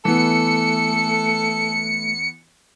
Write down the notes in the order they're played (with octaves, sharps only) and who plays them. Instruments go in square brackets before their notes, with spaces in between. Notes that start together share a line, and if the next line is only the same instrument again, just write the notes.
[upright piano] E3 B3 [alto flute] A3 [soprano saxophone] A4 [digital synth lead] C#7